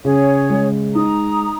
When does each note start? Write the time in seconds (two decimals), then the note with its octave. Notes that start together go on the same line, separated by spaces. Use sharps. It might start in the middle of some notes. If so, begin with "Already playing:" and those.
0.04 C#3 G#4 C#5
0.50 G#3
0.95 D#4 A#5 D#6